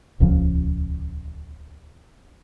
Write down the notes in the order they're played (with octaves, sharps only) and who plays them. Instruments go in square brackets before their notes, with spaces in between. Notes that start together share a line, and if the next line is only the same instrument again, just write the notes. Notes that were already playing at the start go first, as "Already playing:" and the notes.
[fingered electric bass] D#1 C#2 C#3 F3